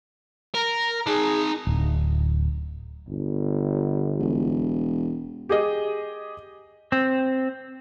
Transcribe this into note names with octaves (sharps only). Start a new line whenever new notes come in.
A#4 A#5
D#4 G#4 A5
D1
G1
E1
G4 G#4 D#5
C4